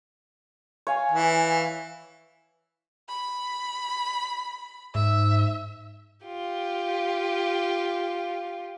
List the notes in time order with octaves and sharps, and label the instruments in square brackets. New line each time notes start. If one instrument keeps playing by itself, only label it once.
[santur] C#5 F5 G#5
[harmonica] E3
[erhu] B5
[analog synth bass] G#2 [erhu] E5
[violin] F4 G4